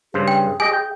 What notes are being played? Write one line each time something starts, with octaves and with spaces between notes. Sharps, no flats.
G2 C#3 G#4 C5
G5
G4 D#5 G#5
G5